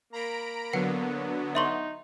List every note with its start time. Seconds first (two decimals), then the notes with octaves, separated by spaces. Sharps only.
0.13 A#3 A#5 B5 D7
0.73 D3 F#3 B3 B4 F#5 C#7
1.55 D#4 E5 C6 C#6